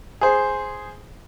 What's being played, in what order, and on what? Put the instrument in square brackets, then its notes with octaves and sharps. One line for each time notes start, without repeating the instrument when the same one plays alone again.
[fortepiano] G#4 C5